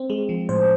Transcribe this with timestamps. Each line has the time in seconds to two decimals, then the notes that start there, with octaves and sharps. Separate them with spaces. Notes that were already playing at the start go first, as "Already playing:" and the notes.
Already playing: C4
0.10 G#3
0.29 F3
0.49 A2 C5